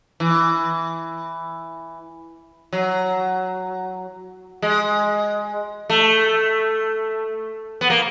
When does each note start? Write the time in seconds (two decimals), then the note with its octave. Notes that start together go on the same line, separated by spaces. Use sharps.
0.20 E3
2.73 F#3
4.62 G#3
5.90 A3
7.81 B3
7.90 A#3